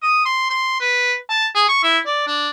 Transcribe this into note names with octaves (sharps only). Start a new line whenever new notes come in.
D#6
C6
C6
B4
A5
G#4
C#6
E4
D5
D4